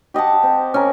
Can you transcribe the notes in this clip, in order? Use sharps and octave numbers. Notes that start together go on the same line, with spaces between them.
G4 D#5 F#5 A5
C4
C#4 A#4